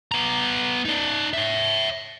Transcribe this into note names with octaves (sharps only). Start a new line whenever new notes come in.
B3 A#5
D#4 D5
C#5 E5